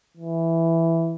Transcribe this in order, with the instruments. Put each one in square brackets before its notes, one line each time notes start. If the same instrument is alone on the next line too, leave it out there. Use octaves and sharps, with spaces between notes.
[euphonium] E3